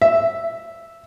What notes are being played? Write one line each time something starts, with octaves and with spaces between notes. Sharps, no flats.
E5